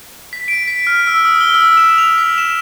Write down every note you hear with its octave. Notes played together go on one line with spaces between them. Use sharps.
B6
D7
B6
F6
E6
D#6
G7
E6
E7
F7
B6
E7